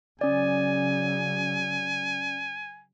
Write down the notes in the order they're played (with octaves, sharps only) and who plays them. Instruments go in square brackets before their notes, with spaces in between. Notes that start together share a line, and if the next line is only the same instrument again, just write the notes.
[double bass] C#3 F#3 [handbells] C#4 D5 [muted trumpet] G#5